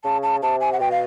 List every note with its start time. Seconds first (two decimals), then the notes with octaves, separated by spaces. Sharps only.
0.04 C#3 A5
0.23 A5
0.43 C3 A5
0.61 G#5
0.73 F#5
0.80 B2 G5
0.91 F5